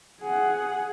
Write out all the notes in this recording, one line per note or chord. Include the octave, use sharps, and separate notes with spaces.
G#4 F#5